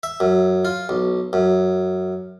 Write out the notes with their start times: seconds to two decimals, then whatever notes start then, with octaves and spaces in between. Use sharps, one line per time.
0.03 E5
0.20 F#2
0.65 F4
0.89 B1
1.33 F#2